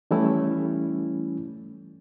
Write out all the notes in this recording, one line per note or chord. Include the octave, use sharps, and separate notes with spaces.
E3 G3 A3 C#4 E4